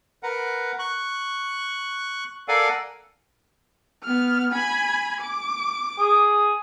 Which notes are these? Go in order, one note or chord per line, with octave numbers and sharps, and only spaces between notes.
A#4 B4 F#5
C#6 F#6
A4 A#4 D5 F5 F#5 G#5
B3 F6
G#5 B5
D6
G#4